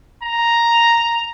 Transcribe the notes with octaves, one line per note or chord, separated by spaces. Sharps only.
A#5